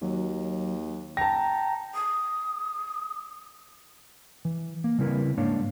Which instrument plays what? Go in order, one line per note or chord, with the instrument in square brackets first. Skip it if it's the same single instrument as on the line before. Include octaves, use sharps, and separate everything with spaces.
[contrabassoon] D#2 [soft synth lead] F#3
[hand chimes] G5 [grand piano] A5 A#6 [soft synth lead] A#5
[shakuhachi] D#6
[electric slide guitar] E3
A#3
C#3 G3 C4 E4 A#4 B4
G#2 A#3 D4 C#5 F5